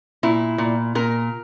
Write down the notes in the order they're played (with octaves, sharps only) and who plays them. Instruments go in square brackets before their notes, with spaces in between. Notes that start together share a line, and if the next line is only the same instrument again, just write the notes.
[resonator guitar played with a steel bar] A#2 E4
A#2
A#2 A#4